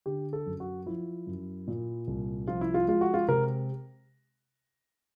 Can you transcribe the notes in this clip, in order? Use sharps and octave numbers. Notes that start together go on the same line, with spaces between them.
D3 G4
A4
F#2
F#4
F3 E4
F#2
A#2
C2
F3 F4
E4
F4
G#3 F4
F#4
F4
C3 A#4